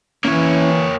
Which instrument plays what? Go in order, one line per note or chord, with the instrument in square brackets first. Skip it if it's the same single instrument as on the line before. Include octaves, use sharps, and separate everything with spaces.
[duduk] E3 [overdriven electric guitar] A#3 C#5 [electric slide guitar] C#4 E4